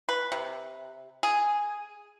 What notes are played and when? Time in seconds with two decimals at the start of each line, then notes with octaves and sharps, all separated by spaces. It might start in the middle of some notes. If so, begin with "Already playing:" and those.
0.09 B4
0.32 C3
1.23 G#4